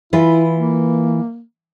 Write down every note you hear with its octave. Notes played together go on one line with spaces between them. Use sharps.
E3 E4 F4 B4
A#3